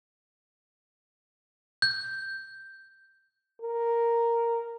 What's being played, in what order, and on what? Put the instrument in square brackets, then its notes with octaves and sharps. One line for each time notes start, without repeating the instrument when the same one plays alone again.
[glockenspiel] G6
[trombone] A#4